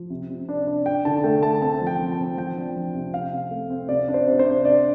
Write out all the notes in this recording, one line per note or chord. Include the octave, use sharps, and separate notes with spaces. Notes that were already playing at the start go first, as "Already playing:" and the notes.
Already playing: F3
C3
C3
D4
D4
D4 G5
D3 A5
A3 G5
A3 A5
C4 A5
F3
G5
F3
A5
C4
F3 G5
D4
F3
C3
C3 F5
C3
A3
C4
C3 D5
D4
C5
C3
C5
D4
D4 D5